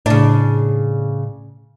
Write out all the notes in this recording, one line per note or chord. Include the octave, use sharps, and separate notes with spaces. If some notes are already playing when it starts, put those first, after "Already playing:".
A2 C#3 D4